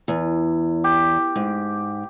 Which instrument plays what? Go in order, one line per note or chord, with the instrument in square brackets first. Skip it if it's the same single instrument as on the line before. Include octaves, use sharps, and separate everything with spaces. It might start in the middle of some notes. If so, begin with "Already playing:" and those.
[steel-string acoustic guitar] E2
[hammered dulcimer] G4
[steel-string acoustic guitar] G#2